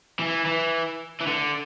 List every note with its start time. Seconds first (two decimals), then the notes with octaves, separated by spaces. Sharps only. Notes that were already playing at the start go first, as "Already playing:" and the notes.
0.19 E3
0.46 E3
1.21 E3
1.27 D3